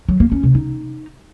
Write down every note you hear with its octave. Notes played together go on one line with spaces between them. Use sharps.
F#3
A#3
C#4
C3
D#4